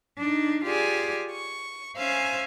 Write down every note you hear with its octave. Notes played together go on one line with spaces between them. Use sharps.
D4 D#4
F4 G4 G#4 D5 G#5
C#6
C#4 C5 E5 F5 G#5